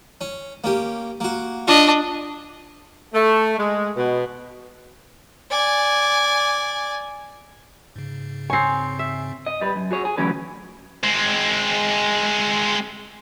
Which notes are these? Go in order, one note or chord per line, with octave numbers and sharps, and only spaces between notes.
C#4
A#3 C#4 G4
A#3 F#4
D4 F4 D#5
A3
G#3
B2
D5 G#5
G#2 C#3
C4 C#5 G#5 C7
E5
D#5
G3 B4
F#2
F#4 G#4 C#5
G#4
D2 E3 F#3 C#4 B4
G#3 C4